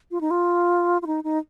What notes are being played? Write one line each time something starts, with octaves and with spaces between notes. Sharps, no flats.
F4
D#4
F4
F4
D#4
D#4